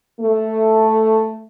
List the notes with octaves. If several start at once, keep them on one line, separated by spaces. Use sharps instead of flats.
A3